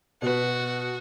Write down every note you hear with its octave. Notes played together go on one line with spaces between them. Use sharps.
B2 F#4 B4